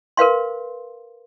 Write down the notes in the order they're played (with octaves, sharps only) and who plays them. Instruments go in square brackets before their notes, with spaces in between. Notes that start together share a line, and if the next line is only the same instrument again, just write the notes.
[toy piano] A#4 B4 F5 C6